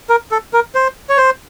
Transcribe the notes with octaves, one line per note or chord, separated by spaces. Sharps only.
A#4
A4
A#4
C5
C#5
C5